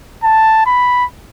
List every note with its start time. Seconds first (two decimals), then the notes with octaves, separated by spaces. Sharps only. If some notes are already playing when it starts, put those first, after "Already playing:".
0.24 A5
0.66 B5